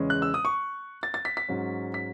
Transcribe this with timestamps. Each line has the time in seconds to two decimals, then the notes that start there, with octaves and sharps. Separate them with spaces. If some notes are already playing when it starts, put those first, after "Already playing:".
Already playing: E2 C#3 G#3 C#4
0.10 F#6
0.22 E6
0.34 D#6
0.45 C#6
1.03 A6
1.14 A6
1.25 B6
1.37 B6
1.49 G#2 F#3 C#4
1.94 B6